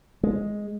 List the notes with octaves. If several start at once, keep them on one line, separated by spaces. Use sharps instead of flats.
G#3